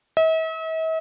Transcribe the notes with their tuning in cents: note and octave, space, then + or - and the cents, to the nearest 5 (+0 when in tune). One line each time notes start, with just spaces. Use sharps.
E5 -45